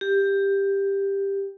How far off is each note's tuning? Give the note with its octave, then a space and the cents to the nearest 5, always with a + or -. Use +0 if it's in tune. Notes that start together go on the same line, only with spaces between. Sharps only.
G4 +10